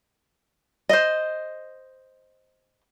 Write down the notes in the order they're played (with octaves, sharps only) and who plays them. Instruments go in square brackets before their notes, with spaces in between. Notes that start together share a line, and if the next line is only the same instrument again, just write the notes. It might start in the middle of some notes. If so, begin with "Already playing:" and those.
[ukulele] C5 D#5